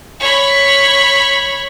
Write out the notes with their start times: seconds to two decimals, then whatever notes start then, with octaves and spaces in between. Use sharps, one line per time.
0.20 C#5 B5